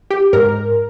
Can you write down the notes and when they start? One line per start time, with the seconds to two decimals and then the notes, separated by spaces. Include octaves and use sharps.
0.10 G4
0.33 G#2 A#4